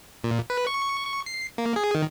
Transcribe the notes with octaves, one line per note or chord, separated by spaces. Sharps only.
A#2
B4
C#6
C#6
C7
A#3
G#4
D#3